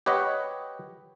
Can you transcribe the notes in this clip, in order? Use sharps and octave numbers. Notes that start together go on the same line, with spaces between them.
G4 B4 C#5 D#5 F#5